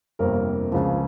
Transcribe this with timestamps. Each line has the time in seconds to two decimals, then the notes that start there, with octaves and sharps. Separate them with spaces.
0.19 G1 F2 C3 G3 A#3 A#4
0.72 C#2 C#3 F3